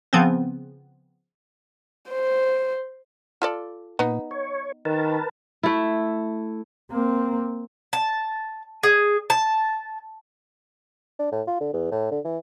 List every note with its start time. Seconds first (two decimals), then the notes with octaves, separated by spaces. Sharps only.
0.13 C#3 F3 B3 C4
2.10 C5
3.42 F4 A4 D5
3.99 A#2 B3 D#4
4.31 C#5
4.85 D#3 A#4 B4 A5
5.63 A3 E4
6.90 A#3 C4
7.93 A5
8.83 G#4
9.30 A5
11.19 D4
11.32 A2
11.47 F4
11.61 D3
11.73 E2
11.92 A2
12.11 D3
12.24 E3